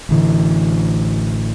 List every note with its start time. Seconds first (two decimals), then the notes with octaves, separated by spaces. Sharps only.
0.09 A1 D3 E3